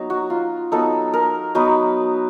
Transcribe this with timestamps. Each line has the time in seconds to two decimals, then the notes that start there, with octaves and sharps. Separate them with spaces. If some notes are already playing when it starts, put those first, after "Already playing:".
Already playing: F#3 B3 D#4
0.10 F#4
0.30 F4
0.72 F#3 B3 D#4 A4
1.13 A#4
1.55 F#3 B3 D#4 B4